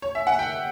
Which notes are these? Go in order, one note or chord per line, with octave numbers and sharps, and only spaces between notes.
C#5
E5
F#5
G5